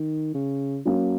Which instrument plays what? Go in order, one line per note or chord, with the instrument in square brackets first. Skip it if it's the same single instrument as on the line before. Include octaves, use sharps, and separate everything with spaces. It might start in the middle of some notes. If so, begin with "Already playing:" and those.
Already playing: [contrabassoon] D#3
C#3
[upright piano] F#3 A#3 C#4